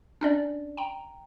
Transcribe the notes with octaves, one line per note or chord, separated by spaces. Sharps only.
C#4 D4 D5
G5 A#5